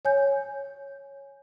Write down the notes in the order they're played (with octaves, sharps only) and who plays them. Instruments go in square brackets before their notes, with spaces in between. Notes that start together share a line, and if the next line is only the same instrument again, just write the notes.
[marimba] C#5 G#5 G6